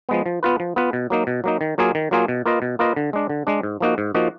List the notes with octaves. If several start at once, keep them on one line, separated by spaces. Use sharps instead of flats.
F3 G#3 B3
F3
B3 F4 B4
F3
B3 F4 B4
B2
F#3 A#3 D#4
B2
F#3 A#3 D#4
D#3
F#3 A#3 F4 G#4
D#3
F#3 A#3 F4 G#4
B2
A#3 F4 B4 D#5
B2
A#3 F4 B4 D#5
D3
G#3 D4
D3
G#3 D4
G#2
F3 A#3 D#4 F#4
G#2
F3 A#3 D#4 F#4